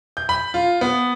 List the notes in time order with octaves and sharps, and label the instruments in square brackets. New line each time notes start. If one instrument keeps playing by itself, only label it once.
[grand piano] G6
B5
F4
B3